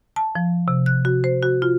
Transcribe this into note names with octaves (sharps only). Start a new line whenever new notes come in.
A5
F3
C3
F#6
F#4
C5
F#4
F4